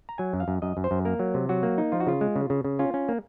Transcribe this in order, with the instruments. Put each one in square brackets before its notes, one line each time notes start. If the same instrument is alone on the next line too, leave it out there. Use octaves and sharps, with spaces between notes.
[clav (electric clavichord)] A#5
F#3 G#5
F#2
F5
F#2
F#2 D#5
F#2
C5
F#2
A#3 A#4
F#3
C3
F#3 F#4
A#3
D#4
F3 F4
F#4
C#3 F4
G#3
C#3
C#3
C#3
C#4 F4
C#4
A#3